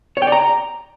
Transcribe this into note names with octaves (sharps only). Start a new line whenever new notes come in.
C#5
G5
D5
A#5